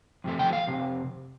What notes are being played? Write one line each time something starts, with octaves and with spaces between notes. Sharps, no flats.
F2 C3 F3 A3
G5
F5
F2 C3